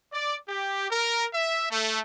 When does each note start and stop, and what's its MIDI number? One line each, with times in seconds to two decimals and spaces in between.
0.13 0.36 74
0.49 0.88 67
0.90 1.25 70
1.33 1.65 76
1.70 1.99 57